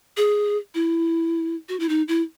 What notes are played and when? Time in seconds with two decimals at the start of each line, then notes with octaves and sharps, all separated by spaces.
0.17 G#4
0.75 E4
1.69 F#4
1.80 E4
1.89 D#4
2.08 E4